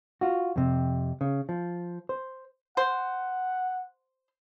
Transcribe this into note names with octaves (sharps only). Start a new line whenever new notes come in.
F4 F#4
F2 C3
C#3
F3
C5
C5 F#5